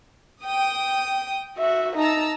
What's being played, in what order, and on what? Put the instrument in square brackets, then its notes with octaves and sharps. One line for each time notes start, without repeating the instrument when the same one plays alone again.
[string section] G5 D#6
[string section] F#4 [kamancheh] E5
[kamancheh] D#4 [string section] A5 A#5 E6